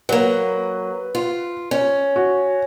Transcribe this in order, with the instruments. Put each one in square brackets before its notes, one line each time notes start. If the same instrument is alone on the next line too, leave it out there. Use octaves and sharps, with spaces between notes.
[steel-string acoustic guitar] F#3 A#3 [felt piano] B4
[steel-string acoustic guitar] F4
C#4
[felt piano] F#4